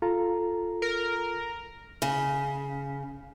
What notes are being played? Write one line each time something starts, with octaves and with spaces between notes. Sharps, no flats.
F4 A4 A#5
A#4
C#3